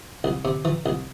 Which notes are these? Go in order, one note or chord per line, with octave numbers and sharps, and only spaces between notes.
C2
C3
E3
C2